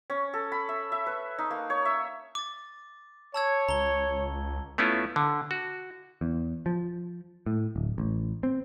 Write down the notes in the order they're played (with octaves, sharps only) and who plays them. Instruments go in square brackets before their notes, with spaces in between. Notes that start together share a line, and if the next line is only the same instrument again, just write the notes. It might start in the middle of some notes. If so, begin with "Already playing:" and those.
[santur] C#4
A4
B5
E5
E5
B4
D#4
A#3
C#5
E5
[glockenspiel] D6 A6
[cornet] C#5 [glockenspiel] A5 E6 G#6
[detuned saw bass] C#2 [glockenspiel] A#5 G7
[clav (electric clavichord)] A3 B3 C#4 E4 F4
D3
F#4
[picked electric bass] E2
F3
A2
D1
A1
C4